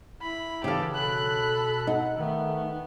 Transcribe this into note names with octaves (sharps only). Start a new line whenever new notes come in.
E4 B5
C#3 E3 G4 A4 F5
B2 A4 B5 F#6
D#4 F#5
D#3 A3 B3